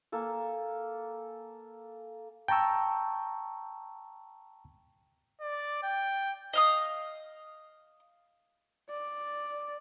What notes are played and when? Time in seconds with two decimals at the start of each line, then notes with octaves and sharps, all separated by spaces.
0.12 A#3 A4 G#5
2.48 G5 A5 A#5 C#6 E6
5.41 D5
5.83 G5
6.53 D#5 F5 D#6
8.90 D5